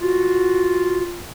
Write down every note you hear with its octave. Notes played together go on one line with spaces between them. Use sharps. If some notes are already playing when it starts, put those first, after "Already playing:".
F4 F#4